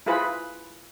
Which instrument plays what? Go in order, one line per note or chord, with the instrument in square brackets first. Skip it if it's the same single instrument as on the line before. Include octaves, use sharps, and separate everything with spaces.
[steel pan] E4 F4 G#4 B4 C5 B5